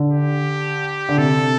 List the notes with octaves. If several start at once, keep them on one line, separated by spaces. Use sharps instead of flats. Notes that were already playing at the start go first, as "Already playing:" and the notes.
Already playing: D3
G4
D3
C3 A4